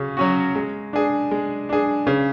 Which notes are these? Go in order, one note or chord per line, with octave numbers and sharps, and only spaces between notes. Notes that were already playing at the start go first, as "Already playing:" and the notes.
Already playing: C#3 C#4 F#4
F#3 C#4 F#4
G#3
D4 G#4
G#3
D4 G#4
C#3